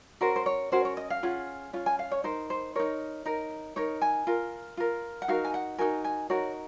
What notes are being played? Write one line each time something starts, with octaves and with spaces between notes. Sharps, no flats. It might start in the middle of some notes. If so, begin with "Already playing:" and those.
C#4 F#4 A#4 C5
C5
C#5
C#4 F#4 A#4 C5
C#5
D#5
F5
C#4 F4 G#4 F#5
C#4 F4
G#5
F5
C#5
D#4 A#4 C5
C5
D#4 A#4 C#5
D#4 A#4
D#4 A#4 C#5
G#5
F4 A#4
F4 A#4
F#5
D#4 F#4 A#4 F5
G#5
F#5
D#4 F#4 A#4 G#5
G#5
D#4 F#4 A#4 C#5